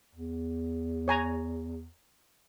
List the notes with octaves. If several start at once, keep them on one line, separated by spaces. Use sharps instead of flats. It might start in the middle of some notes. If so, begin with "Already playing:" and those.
E2
C#5 G#5 A#5